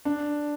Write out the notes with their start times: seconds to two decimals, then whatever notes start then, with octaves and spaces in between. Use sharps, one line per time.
0.05 D4